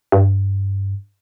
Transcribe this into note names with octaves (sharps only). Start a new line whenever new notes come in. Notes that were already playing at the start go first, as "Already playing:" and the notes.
G2